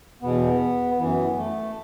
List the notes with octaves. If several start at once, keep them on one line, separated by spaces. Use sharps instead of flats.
E2 B2 B3
F#2 E3 B3
A3